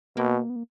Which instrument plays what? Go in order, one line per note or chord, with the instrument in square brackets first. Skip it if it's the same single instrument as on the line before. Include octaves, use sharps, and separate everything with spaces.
[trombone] B2 [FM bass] A#3
[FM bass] B3
A#3